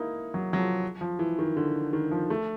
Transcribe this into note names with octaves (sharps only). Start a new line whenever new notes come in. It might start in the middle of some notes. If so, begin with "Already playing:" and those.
Already playing: A#3 D#4 E4
F#3
F#3
F3
F3
E3
D#3
D3
D#3
F3
A3